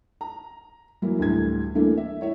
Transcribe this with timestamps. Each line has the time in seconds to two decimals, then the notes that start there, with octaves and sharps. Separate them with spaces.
0.21 A#5
1.02 E3 F#3 A#3 E4
1.19 D2 A2 E3 G3 G#6
1.75 E3 A3 A#3 D4
1.97 E5
2.21 E4 C#5 E5